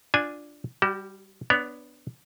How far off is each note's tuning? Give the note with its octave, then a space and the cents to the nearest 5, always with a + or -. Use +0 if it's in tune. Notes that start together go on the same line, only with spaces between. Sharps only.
D4 +0 F4 +0 G#5 +0
G3 +0 F#4 +45
B3 +0 D4 +0 C#5 +25